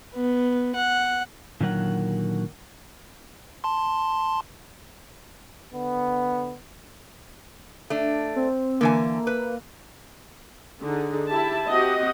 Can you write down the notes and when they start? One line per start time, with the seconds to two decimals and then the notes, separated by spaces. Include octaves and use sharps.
0.15 B3
0.75 F#5
1.61 A#2 D3 D#3 F#3 A#4 F#5
3.64 A5 C6
5.71 D3 B3
7.90 A3 D4
8.36 C4
8.81 D3 E3 A#3 G#5
9.27 B4
10.81 D3 D#4 G#4
11.28 E4 G4 E5 A5
11.68 C4 F#4 G4 D#5 F#5